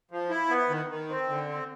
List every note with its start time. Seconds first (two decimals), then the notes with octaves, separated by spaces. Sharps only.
0.11 F3
0.30 E4
0.49 B3
0.69 D#3
0.89 D#3
1.09 C4
1.29 D3
1.49 C4